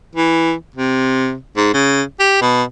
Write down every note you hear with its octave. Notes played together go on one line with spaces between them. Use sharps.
E3
C3
G#2
C#3
G4
B2